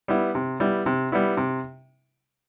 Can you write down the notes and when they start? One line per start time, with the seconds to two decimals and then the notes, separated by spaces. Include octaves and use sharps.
0.08 G3 B3 E4
0.35 C3
0.60 G3 B3 E4
0.86 C3
1.12 G3 B3 E4
1.37 C3